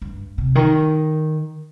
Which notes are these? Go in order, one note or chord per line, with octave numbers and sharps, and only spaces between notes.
G2
C3
D#3